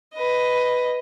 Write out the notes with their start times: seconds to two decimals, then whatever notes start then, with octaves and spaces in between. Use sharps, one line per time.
0.14 B4 D#5